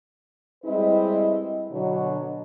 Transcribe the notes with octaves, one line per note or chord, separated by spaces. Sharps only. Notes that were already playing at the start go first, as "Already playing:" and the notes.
G3 G#3 C4 E4 B4 D#5
B2 D3 F#3